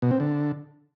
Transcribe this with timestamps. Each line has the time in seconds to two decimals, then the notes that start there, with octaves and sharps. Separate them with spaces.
0.02 B2
0.11 C4
0.20 D3